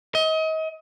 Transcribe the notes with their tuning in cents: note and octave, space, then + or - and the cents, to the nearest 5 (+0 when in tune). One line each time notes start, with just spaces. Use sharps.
D#5 +35